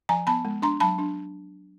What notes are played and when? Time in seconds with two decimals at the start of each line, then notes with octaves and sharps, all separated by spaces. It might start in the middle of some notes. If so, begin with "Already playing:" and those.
0.09 F3 G#5 A#5
0.27 B3 A5 B5
0.45 G#3
0.62 D4 A#5 C6
0.80 F#3 A5 B5
0.98 D4